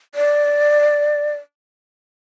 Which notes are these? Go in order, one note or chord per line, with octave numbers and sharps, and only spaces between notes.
D5